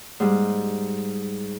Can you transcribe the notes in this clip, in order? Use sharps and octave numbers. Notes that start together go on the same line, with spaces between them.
G#2 G3